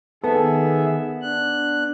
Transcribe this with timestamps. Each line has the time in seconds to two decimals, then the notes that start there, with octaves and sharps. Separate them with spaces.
0.24 D#3 B3 G#4 A4 E5
1.22 D4 F#6